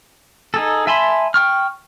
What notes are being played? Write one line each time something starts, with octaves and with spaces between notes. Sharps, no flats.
D#4 G#4 A4
E5 G#5 A5 B5 C6
G5 C#6 F6